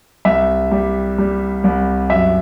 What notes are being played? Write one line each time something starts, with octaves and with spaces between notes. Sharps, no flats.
C2 E5
G3
G3
C2
F#2 E5